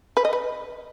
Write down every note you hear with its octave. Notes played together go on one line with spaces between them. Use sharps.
B4
D#5
B4